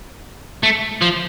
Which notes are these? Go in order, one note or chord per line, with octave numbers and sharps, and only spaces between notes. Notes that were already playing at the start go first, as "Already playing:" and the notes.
A3
F3